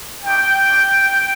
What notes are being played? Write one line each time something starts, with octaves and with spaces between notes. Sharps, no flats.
A3 D#4 G4 G5
A3 D4 G4